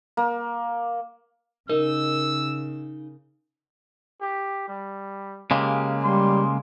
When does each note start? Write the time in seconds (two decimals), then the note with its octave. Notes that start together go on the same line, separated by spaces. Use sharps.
0.17 A#3
1.70 C#3 D#4 A#4 E6
4.21 G4
4.68 G3
5.51 C#3 G#3 A#3 G4
6.04 G3 C6